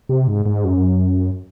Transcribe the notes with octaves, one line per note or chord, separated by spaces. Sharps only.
C3
G#2
G#2
F#2